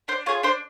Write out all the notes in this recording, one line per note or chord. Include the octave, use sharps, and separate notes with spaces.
D4 C5
F4 G#4 C#5
D4 C5